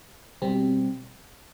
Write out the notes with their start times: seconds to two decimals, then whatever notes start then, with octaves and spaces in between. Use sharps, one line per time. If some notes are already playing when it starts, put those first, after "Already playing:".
0.42 B2 G3 C4